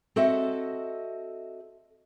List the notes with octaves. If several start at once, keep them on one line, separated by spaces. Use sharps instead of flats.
C4 F#4 A4 D#5 E5